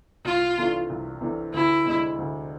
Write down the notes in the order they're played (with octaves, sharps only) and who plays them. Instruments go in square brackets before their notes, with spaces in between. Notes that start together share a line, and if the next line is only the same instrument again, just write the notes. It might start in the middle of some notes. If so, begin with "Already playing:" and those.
[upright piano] C2 [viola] F4
[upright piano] C3 E3 A3 D4
C2
C3 E3 A3 D4
[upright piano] D2 [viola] E4
[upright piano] C3 G#3 D4
D2